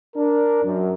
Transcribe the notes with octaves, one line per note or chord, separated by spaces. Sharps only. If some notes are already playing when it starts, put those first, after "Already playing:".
D4 A#4
F#2